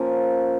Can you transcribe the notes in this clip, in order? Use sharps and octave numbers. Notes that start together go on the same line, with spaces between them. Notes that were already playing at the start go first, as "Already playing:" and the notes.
Already playing: F3 A#3 C#4